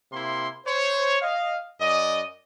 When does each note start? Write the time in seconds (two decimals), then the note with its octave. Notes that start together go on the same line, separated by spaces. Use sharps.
0.13 C3 A#3 E4 C6
0.66 C5 C#5
1.21 D#5 F5
1.80 F#2 D5 D#5